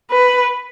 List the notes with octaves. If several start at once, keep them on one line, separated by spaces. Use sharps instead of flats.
B4